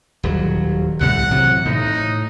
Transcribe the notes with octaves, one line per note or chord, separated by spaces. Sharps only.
D#1 F#3
C2 A2 F#5
C3 E3 F#3
A2 D#4